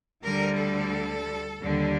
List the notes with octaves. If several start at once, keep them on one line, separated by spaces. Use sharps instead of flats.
D2 D3 G3 A#4
A4
D#2 D3 G3